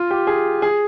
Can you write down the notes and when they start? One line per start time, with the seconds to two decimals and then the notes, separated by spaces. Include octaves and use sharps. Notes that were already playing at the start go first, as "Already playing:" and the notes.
Already playing: F4
0.11 G4
0.27 G#4
0.62 G#4